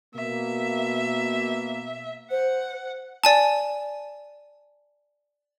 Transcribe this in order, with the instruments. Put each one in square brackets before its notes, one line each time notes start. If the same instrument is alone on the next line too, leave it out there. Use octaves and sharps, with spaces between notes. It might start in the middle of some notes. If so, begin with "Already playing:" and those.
[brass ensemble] B2 A#3 [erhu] E5
[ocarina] C5 [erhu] F#5
[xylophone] D5 G#5 A5